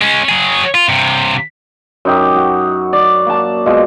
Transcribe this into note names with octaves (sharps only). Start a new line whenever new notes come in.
G#3 C#4
F#3 G#4
F4
G2 C3
F#2 D#4 G4
F#4
D5
A#3 A5
B2 G#3 F4